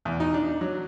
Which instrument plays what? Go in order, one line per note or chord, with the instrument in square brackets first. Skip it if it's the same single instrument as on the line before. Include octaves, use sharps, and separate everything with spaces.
[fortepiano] E2
D#4
D4
F#3